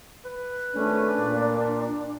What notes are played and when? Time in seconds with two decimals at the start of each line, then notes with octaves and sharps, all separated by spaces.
0.25 B4
0.73 G#1 A3 C#4 D4
1.18 A#2